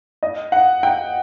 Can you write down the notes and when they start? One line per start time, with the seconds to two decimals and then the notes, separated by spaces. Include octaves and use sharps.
0.23 D#5
0.52 F#5
0.83 G5